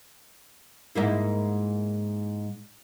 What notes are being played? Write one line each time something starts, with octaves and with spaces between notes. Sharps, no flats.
G#2 A#3 E4